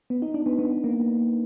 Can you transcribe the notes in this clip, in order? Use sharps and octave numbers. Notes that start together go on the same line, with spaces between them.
B3
D#4
D4
B3
B3
A#3